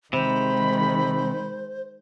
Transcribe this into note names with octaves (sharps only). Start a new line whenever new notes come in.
C3 D#3 G#3 C5 B5